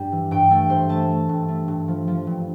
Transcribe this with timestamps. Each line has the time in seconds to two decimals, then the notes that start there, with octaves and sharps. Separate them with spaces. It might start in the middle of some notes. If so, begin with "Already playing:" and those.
Already playing: G2 G3
0.12 E3
0.31 G2 G5
0.50 A3 G5
0.70 G2 C5
0.89 A3 A5
1.09 A3
1.29 G2
1.48 A3
1.68 G2
1.88 F3
2.08 F3
2.27 G2